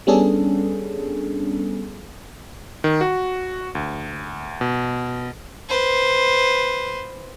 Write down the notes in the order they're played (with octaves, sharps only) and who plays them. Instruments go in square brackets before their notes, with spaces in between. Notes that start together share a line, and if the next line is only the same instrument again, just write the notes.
[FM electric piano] G3 B3 C#4 D4 G#4 A4
[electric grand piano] D#3
F#4
D2
B2
[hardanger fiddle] B4 C5